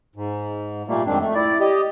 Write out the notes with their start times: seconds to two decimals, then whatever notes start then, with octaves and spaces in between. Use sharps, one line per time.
0.16 G#2
0.88 A#2 G3 A3 A#3
1.06 F2 G#2 D#3 C4 D4
1.20 A3
1.35 E4 D5
1.60 G4 D#5